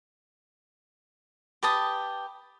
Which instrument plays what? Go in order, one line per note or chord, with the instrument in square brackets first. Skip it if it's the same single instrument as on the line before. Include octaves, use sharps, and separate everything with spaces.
[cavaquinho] G4 B4 A5 D#6